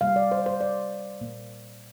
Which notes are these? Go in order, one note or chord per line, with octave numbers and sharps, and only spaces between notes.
C3 G3 A#3 F5
D5
C5
C5
D5
A#2 A#3